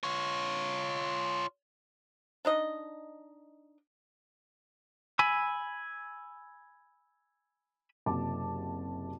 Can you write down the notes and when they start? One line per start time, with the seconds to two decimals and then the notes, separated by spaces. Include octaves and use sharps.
0.03 F4 C#5
2.45 D4 D#4 D#5
5.19 G#5 B5 E6
8.06 F#1 C3 F#4 A5 D6